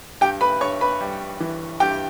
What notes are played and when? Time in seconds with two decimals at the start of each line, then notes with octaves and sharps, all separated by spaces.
0.21 G2 G4 G5
0.41 B4 B5
0.60 G2 C#5 C#6
0.81 B4 B5
1.01 G3
1.40 E3
1.80 G2 G4 G5